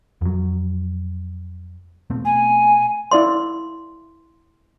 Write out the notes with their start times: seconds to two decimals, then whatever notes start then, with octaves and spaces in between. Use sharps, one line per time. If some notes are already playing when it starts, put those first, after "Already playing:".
0.21 F2 F#3
2.10 B2 A3 C4
2.25 G#5
3.11 E4 D5 F5 C6